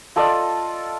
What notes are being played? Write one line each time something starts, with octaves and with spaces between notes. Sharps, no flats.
F4 A4 D5 D#5